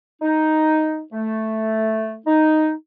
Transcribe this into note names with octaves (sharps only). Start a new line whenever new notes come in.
D#4
A3
D#4